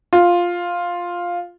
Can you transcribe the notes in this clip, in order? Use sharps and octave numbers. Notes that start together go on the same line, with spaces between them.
F4